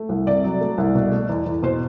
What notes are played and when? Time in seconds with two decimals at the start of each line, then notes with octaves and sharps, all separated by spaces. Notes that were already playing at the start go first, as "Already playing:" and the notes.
Already playing: A3
0.09 C2
0.26 C3 D5
0.44 F#3
0.61 A3
0.78 C2
0.95 B2
1.11 A3
1.29 E2
1.46 E2
1.62 B2 C5